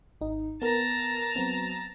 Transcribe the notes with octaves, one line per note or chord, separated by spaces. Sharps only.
G#1 D#4
B3 A#4 A5 A#5
F#3 B3 C4